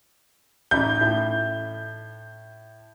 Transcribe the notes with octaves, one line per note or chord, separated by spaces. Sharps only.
A1 D#4 B5 G6
A2